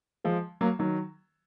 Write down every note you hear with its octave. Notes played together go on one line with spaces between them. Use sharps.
F3 G#3
F#3 A#3
D#3 F#3